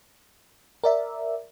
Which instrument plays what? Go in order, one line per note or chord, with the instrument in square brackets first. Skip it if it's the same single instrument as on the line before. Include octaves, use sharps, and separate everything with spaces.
[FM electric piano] A#4 D5 E5